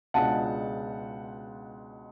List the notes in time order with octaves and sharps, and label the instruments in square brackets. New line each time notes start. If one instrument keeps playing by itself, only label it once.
[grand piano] C#2 B2 G#3 D4 F4 F#5 A5